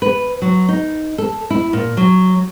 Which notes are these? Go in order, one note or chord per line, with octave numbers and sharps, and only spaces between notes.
B4
F#3
D#4
A4
E4
A#2
F#3